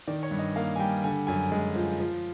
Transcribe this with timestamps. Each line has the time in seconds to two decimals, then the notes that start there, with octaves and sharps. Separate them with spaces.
0.07 D#3 D5
0.23 C#5
0.31 G2
0.39 D#5
0.56 A#3 F5
0.76 G#5
0.79 G3 G5
1.04 D3 G#5
1.27 F#2 G#5
1.52 G#3
1.76 F3
2.00 F3